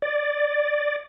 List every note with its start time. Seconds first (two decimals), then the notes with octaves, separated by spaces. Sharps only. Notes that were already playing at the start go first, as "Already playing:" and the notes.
0.02 D5